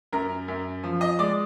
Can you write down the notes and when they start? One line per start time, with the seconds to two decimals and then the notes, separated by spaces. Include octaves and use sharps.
0.13 F#2 A#4 A#5
0.48 F#2
0.84 F3
1.01 D#5 D#6
1.19 G#3 D5 D6